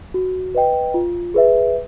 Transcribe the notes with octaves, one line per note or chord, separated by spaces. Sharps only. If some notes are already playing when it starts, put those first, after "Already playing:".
F#4
B4 D#5 G5
F4
G#4 B4 E5